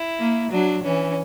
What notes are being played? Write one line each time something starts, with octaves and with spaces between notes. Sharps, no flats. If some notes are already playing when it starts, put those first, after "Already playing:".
Already playing: E4
A#3
F#3 D4
E3 C#4